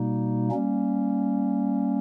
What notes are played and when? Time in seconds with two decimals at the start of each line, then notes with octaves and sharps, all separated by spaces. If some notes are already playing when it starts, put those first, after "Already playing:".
Already playing: B2 G3 A#3 D#4
0.51 G3 A#3 C#4